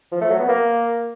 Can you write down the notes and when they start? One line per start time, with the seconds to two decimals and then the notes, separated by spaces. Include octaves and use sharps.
0.12 F3
0.21 A3
0.30 F#3
0.40 B3
0.49 A#3